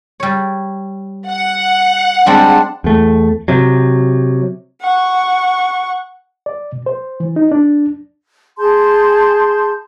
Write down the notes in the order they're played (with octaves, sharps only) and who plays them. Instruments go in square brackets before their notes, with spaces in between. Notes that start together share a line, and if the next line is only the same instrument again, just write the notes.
[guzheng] G3 C#5
[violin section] F#5
[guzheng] G3 G#3 C4 [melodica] D4
[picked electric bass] E2 A3
C3 F#3
[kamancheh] F#5 C#6
[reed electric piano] D5
B2
C5
E3
D#4
D4
[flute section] G#4 A5 C6 G6